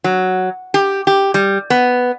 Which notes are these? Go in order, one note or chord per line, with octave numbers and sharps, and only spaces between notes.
F#3
G4
G4
G3
B3